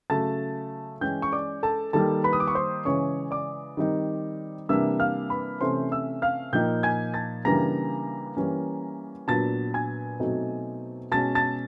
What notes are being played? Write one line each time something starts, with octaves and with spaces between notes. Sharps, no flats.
C#3 F#3 A3 A5 A6
E3 G#3 C#4 G5 G6
C#6
D5 D6
A4 A5
D#3 G3 A#3 A4 A5
B4 B5
D#6
D6
C#6
C5 C6
C#3 E3 G#3 C#4 C#5 C#6
D5 D6
D#3 G3 C4 D#4
C3 E3 G3 A#3 D4 E5 E6
F5 F6
B4 B5
C3 E3 A3 C#4 C5 C6
E5 E6
F5 F6
A#2 F3 A#3 D#4 G5 G6
G#5 G#6
A5 A6
C#3 E3 G3 A#3 D4 A#5 A#6
E3 G3 A#3 C#4
A#2 F#3 B3 D4 A5 A6
G#5 G#6
B2 F#3 A3 C4 D#4
B2 G#3 C#4 A5 A6
A5 A6